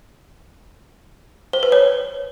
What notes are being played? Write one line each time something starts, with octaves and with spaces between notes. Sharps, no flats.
C5
B4
C#5